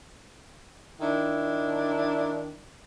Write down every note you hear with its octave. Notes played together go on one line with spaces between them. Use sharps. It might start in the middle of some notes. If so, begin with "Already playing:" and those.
D#3 D4 E4